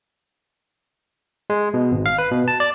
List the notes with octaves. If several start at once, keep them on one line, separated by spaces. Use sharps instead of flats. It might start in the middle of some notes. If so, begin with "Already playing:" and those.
G#3
B2
G#1
F5
B4
B2
A5
D5